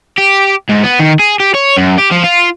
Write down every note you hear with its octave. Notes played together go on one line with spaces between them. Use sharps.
G4
G#2
B3
D#3
G#4
G4
C#5
F#2
G4
F3
F4